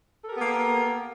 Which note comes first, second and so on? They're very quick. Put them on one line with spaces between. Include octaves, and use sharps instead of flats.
A4 A#4 G4 B3 A#3